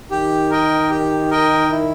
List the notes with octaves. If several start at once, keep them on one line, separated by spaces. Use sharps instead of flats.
D#3 G4
A#4 D#5 G5
G4
A#4 D#5 G5
E4